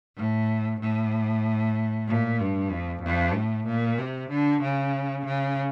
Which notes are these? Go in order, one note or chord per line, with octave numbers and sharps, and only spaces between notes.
A2
A2
A#2
G2
F2
F2
A2
A#2
C3
D3
C#3
C#3